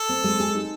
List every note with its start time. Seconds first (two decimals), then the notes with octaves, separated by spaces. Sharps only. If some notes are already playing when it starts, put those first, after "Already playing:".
Already playing: A4
0.09 C4
0.24 G#3
0.40 G#4
0.54 D#4